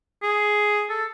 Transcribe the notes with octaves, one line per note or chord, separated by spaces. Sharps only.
G#4
A4